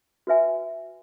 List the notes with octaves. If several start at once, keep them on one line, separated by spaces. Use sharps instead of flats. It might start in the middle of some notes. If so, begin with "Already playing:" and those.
F#4 B4 E5 G#5